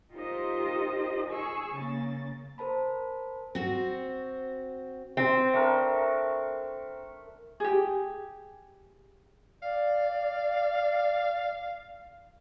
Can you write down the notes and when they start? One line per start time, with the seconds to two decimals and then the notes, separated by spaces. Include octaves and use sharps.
0.12 D#4 F4 G4 A#4 C5 D#5
1.30 G#4 G#5 C#6 E6
1.76 C#3 A#3 A6
2.58 A#4 C5 A5 B5
3.55 C4 F#4
5.17 C4
5.53 A3 D4 A#4
7.60 G4 G#4
9.62 D5 F5